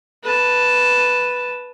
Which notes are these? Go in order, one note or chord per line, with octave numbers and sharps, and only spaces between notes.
B4 A5